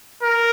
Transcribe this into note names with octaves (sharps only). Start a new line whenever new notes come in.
A#4